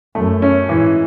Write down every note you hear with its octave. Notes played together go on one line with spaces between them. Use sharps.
F#2 A3
C#4
G#2 E3